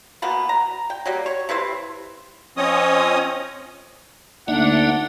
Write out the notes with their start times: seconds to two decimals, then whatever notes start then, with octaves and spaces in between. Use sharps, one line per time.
0.22 B2 A#3 B3 B5
0.49 A#5
0.90 G5
1.06 F#3 G3 A#3
1.26 C#5
1.49 C3 E4 B4 C5
2.57 F3 C4 C#4 C#5 D#5 D#6
4.48 D2 A#3 D4 D#4 E5 F#5